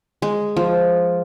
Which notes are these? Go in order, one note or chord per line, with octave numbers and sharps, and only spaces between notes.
G#3
F3